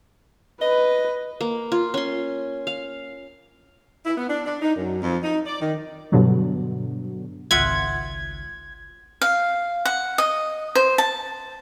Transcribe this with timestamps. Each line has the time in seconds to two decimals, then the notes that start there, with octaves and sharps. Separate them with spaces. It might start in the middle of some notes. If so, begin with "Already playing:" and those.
0.61 B4 D#5
1.41 A#3
1.72 F4
1.94 C#4 C6
2.67 F5
4.06 E4
4.18 B3
4.29 D4
4.46 D4
4.62 D#4
4.75 F#2
5.02 F2
5.23 D#4
5.46 D5
5.61 D#3
6.12 G2 B2 D3 F#3
7.51 G#1 C#2 F4 E5 F#5 G#6
9.21 F5
9.85 F#5
10.18 D#5
10.75 C5
10.98 A5